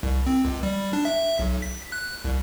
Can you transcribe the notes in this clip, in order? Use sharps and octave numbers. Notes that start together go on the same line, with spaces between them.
C2
C4
C#2
G3
D4
E5
B1
B6
F#6
C2